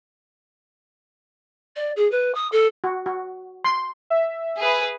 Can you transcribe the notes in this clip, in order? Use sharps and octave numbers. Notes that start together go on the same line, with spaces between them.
D5
G#4
B4
D#6
A4
F#4
F#4
C6
E5
G#4 B4